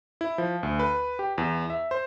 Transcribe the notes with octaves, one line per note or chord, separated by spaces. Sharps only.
E4
F3
D2
B4
G4
E2
E5
C5